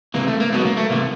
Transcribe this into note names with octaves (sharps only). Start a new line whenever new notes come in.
C#2 C3 E3 A#3
A3
A#3
C#2 B2 F#3 B3
A#3
A3
C2 C3 E3 A#3